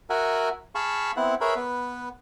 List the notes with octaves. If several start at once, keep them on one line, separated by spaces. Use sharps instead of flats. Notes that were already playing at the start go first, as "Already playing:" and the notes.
F#4 A#4 E5 F#5 G#5
G#4 F5 A5 B5 C#6
B3 C4 E4 F#5
G#4 A#4 B4 C#5 E5 B5
B3 B4